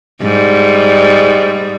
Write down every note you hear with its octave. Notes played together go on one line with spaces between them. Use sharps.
G#2 G3